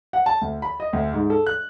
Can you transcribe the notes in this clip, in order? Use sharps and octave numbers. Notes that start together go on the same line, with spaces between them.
F#5
A5
D2
B5
D#5
D2
G#2
A4
F#6